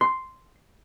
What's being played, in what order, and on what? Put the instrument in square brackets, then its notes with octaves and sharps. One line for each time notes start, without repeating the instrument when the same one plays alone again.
[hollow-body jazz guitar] C6